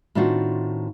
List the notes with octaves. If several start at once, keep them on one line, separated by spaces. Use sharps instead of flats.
A2 D#3 C4 D4 F4 F#4